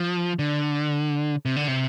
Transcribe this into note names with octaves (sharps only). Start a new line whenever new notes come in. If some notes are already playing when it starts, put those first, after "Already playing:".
Already playing: F3
D3
C3
D3
C3